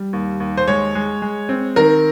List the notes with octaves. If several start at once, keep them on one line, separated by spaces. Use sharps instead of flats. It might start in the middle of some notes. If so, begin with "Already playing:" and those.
Already playing: G3
D#2
D#2
C5
G#3 C#5
G#3
G#3
C4
D#3 A#4